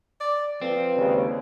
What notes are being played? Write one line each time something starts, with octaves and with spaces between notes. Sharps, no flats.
D5
F3 C4 A4 B4 D5
D#2 C#3 G#3